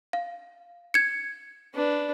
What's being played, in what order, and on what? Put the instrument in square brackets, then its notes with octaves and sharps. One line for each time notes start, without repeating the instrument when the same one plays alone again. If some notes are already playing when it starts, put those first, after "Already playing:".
[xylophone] F5
G#6 C#7
[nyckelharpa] D4 B4